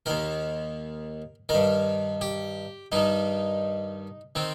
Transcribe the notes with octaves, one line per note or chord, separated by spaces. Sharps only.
D#2 D#3 A#4
G2 D#3 A#4
G4
G2 D#3 D#4
D#3 C4